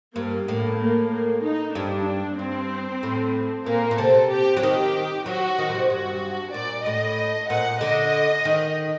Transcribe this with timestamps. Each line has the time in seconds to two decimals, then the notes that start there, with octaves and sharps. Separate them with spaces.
0.16 G2 A#3
0.48 A2 A#3
0.80 A#3
1.11 A#3
1.44 D#4
1.75 G2 D4
2.39 G2 C4
3.03 A2
3.66 A#2 A#3
3.91 A#2
3.98 C3 A4
4.30 G4
4.57 F#3
4.63 D#3 G4
5.26 F#3 F#4
5.58 D#3
5.69 A#2
5.74 C3
5.90 G2 F#4
6.54 A#2 D5
6.85 A2 D#5
7.50 A#2 F#5
7.81 D3 D#5
8.45 D#3